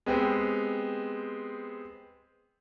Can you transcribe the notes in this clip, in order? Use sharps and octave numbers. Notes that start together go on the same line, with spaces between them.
G#3 B3 C4 G4